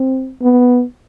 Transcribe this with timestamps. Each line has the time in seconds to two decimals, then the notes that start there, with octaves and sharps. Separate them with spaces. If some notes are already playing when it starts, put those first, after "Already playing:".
Already playing: C4
0.42 B3